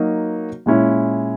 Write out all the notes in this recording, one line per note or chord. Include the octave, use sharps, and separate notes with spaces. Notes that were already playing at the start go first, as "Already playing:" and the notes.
Already playing: F#3 A#3 D#4 F#4
A#2 G#3 C#4 E4